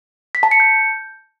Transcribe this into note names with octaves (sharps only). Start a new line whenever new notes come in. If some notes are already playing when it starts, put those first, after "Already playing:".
B6
A5
C#7
G6